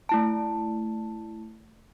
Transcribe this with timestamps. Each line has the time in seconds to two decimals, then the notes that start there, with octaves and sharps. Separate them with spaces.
0.09 A3 E4 A5